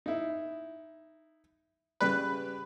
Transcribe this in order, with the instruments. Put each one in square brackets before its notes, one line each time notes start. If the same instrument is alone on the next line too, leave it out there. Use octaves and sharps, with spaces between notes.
[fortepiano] D#4 E4
[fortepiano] C#3 G3 D5 [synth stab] B4